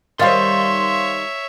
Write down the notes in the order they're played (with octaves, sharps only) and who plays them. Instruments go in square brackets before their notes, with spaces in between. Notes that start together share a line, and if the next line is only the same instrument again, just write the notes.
[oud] D#3 G3 [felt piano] C5 F5 A6 [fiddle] C#5 E5 [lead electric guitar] C6